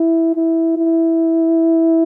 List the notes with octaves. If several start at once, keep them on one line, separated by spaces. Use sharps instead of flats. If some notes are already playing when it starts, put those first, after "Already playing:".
Already playing: E4
E4
E4